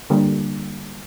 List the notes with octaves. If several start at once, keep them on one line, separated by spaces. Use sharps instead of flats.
D3 G3 A#3